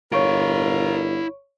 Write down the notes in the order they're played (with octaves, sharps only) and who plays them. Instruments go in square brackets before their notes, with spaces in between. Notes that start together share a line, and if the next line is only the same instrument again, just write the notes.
[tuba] G1 [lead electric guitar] E4 F5 [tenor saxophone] A#4 [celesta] C#5 C#6 D7